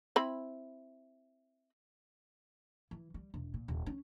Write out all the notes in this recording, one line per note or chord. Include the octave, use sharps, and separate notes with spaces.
C4 E4 B5
E3
G3
E1
A#2
D#1
C#4